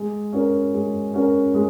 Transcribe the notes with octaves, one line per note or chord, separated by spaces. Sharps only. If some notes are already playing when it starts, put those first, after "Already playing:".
Already playing: G#3
C#4 F#4 A#4
G#3
C#4 F#4 A#4
G#3